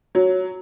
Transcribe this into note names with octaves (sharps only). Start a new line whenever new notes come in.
F#3